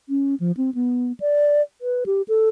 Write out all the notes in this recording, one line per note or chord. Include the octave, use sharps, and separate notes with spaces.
C#4
F3
C4
B3
D5
B4
G4
A4